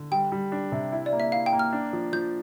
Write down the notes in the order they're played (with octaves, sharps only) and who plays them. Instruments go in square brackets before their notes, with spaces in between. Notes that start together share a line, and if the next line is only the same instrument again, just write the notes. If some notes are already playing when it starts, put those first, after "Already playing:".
Already playing: [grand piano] D3
[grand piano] G3 [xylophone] G5
[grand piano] G3
D4
C3
E4
[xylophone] D5
[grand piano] A#3
[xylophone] E5
[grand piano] E4 [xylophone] F5
[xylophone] G5
[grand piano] A#3
[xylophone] F6
[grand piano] D4
F3
[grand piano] F3 [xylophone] G6